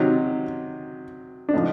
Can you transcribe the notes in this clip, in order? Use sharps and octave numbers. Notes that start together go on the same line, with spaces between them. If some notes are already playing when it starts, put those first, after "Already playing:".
Already playing: C3 D#3 F#3 D#4
D4
A2 F3 D#4